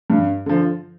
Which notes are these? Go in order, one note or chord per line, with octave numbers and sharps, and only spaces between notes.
G2
D3 F3